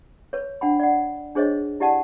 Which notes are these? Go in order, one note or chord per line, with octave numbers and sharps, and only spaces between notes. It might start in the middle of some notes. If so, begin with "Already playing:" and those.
B4 C#5
D4 F#5 G5 B5
D5 F#5
D4 G#4 C5 C#5 D#5
E4 G4 D5 F#5 A5